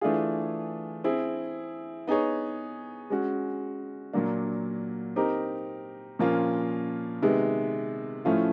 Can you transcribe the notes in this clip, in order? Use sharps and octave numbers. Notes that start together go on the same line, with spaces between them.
E3 A3 D4 F4 G#4
C4 E4 G#4
B3 D#4 G#4 C#5
G#3 C#4 F#4
A#2 F#3 A#3 D4
C4 D#4 G4 A#4
A#2 F3 A#3 C#4 F4
C3 D#3 G#3 B3
A2 F3 A3 C#4 F4